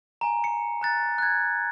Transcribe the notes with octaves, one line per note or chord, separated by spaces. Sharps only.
G#5 A#5
C#7
A#5 F#6 A6
F#6 G#6